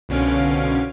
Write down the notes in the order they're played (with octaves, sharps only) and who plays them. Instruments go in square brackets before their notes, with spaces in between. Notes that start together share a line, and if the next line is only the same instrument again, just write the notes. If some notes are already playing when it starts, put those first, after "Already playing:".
[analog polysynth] C2 B2 D3 C#4 F5 D7